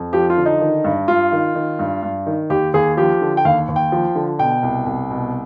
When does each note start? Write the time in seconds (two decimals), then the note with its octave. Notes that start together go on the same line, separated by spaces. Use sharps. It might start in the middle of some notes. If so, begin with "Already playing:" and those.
Already playing: F2
0.13 F3 G4
0.30 F4
0.37 D3
0.46 D#4
0.61 D#3
0.84 G2
1.08 G2 F4
1.32 D#3
1.55 D#3
1.79 G2
2.03 G2
2.26 D#3
2.50 D#2 G4
2.74 D#2 G#4
2.97 F3 G4
3.21 D3
3.37 G5
3.45 D#2 F5
3.69 D#2
3.76 G5
3.92 F3
4.15 D3
4.39 B2 G5
4.63 C2
4.86 C2
5.11 B2